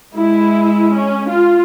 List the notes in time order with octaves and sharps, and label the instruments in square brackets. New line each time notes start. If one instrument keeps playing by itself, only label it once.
[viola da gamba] G#3 [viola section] E4
[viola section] C#4
F4